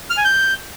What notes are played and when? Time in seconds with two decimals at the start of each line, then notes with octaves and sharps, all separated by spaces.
0.10 F6
0.17 G#5
0.24 G6